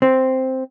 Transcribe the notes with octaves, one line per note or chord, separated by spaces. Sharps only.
C4